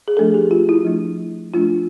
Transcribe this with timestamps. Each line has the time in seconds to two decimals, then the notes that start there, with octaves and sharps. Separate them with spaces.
0.08 G#4
0.17 F3 A3 D4 A4
0.34 G4
0.51 F4
0.69 E4
0.85 F3 A3 D4
1.54 F3 A3 D4 F4